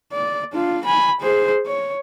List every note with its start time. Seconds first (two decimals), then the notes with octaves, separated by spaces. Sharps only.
0.12 D5
0.53 D4 F4
0.85 G#5 B5
1.21 G#4 C5
1.66 C#5